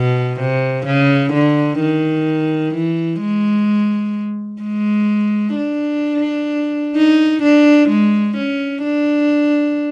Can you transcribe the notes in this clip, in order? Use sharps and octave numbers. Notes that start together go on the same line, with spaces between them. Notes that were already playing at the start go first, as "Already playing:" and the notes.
Already playing: B2
C3
C#3
D3
D#3
E3
G#3
G#3
D4
D#4
D4
G#3
C#4
D4